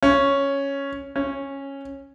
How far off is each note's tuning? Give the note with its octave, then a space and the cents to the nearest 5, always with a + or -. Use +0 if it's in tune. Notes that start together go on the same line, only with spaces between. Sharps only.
C#4 +0
C#4 -10